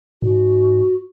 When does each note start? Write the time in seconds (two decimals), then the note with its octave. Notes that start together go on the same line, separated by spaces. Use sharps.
0.22 G#2 F#4